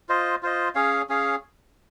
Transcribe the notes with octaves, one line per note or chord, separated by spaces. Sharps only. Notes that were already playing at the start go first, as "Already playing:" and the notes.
F4 C5 D#5
F4 C5 D#5
C#4 G#4 C#5 F5
C#4 G#4 C#5 F5